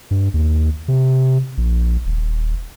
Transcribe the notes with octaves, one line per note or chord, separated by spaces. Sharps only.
G2
D#2
C3
A#1
D#1